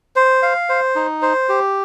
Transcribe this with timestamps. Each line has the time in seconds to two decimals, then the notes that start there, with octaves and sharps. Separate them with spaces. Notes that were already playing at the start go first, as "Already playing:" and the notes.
0.16 C5
0.43 F5
0.69 C5
0.96 D#4
1.22 C5
1.49 G4